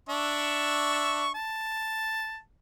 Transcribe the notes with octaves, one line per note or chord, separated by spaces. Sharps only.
D4 E5 C#6
A5